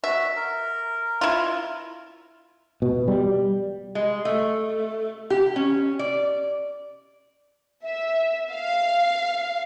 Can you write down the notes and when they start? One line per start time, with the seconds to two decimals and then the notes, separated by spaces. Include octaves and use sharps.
0.04 F#4 E5
0.36 A#4
1.21 E4 F4
2.82 B2
3.08 G3
3.95 G#3
4.25 A3
5.30 G4
5.56 C#4
5.99 D5
7.84 E5
8.52 F5